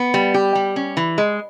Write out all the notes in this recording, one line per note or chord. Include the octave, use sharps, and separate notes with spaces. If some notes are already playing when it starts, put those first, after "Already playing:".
Already playing: B3
G3
G4
G3
C#4
E3
G#3